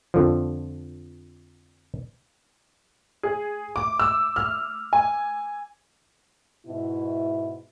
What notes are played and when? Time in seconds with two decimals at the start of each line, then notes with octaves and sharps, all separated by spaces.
0.14 F2 D3 F3
3.23 G#4
3.76 D6
3.99 E6
4.36 F6
4.93 G#5
6.66 G#2 B2 E4